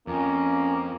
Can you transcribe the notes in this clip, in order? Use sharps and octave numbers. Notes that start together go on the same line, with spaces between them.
F2 A#3 C#4